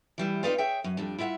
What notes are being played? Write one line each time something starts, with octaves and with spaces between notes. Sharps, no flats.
E3 G3 E4
C4 D#4 F4 B4 D5 F5
G#4 C#5 E5 G5
F#2
F2 G3 D4
E4 F4 E5 F#5